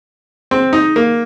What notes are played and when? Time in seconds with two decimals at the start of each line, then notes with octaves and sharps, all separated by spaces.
0.51 C4
0.73 D#4
0.96 A#3